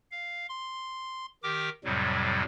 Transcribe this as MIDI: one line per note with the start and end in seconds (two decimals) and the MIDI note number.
0.11 0.46 77
0.49 1.26 84
1.43 1.69 51
1.43 1.69 67
1.43 1.69 70
1.43 1.69 79
1.43 1.69 86
1.84 2.43 41
1.84 2.43 45
1.84 2.43 48
1.84 2.43 54
1.84 2.43 55